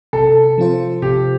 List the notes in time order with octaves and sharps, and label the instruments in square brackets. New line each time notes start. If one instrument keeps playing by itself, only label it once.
[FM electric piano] C3 [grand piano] A4
[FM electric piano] F3 C4 F4 C5
[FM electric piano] C3 [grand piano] G4